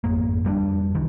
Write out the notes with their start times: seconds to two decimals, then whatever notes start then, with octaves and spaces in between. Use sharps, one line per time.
0.04 G#1 F2 A#3
0.44 F2 G3 A#3 D4
0.95 C2 D#3 E3